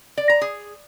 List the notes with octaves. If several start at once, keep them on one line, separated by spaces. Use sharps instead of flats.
D5
A#5
G#4